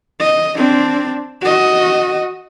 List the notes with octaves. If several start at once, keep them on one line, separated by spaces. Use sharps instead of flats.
D#5
C4 D4
F#4 D#5